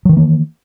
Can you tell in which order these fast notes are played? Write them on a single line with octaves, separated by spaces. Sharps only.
F#3 D#3 E3 A#3